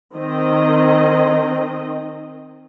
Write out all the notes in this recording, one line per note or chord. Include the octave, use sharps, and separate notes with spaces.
D#3 C4 D#5